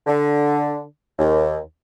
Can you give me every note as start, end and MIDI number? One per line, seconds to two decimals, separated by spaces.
0.07 0.83 50
1.18 1.58 39